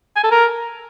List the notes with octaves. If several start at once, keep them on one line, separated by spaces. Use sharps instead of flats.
G#5
A4
A#4